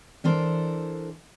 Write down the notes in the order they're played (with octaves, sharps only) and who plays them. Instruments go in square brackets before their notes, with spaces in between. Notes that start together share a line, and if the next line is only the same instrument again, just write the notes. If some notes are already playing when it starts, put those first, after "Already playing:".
[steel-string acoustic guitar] E3 D4 A4 A#4 C5